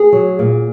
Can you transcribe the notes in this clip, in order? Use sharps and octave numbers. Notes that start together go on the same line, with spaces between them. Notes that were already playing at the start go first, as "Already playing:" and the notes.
Already playing: G#4
F#3
A#2